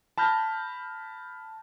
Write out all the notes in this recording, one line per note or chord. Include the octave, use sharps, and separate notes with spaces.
A5 B5 F6 G6 A#6